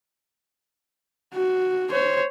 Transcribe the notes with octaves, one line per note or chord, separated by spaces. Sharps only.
F#4
C5 C#5